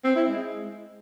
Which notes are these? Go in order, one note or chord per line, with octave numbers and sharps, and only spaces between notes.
C4
E4
G#3